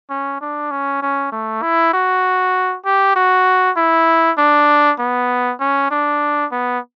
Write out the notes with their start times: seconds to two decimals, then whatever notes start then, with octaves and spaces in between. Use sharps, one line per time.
0.10 C#4
0.41 D4
0.71 C#4
1.02 C#4
1.32 A3
1.62 E4
1.94 F#4
2.85 G4
3.16 F#4
3.77 E4
4.38 D4
4.99 B3
5.60 C#4
5.91 D4
6.52 B3